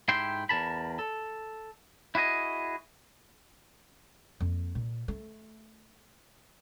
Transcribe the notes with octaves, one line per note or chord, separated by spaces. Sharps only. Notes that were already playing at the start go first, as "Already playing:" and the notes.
G#2 E4 G4 G5 C6
E2 A#4 A5 B5
A4
E4 F#4 G#4 D#5
F2 A#3
A#2
A3